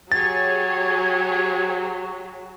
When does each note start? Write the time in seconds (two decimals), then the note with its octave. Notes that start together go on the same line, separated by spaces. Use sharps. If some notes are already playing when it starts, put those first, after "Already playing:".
0.12 F#3 G4 G#4 C#5 G#6 A6